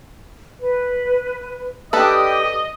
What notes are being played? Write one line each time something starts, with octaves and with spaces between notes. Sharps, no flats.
B4
D4 G4 A4 B4 D#5 D#6